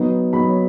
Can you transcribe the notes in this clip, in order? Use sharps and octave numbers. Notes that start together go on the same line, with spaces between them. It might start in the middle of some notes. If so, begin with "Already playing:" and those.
Already playing: F#3 B3 D#4
F#3 B3 D#4 B5
C#5